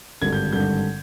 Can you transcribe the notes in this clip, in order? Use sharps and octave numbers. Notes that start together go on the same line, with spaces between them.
G#1 G2 D3 G3 G#6
G6
G#1 G2 D3 G3 G6